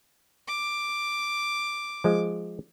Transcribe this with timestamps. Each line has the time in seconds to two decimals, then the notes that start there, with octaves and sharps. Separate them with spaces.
0.48 D6
2.04 F3 G#3